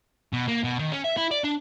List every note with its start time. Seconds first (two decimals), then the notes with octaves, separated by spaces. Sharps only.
0.33 B2
0.48 A#3
0.64 B2
0.79 D#3
0.92 C#4
1.04 E5
1.17 E4
1.31 D5
1.44 D4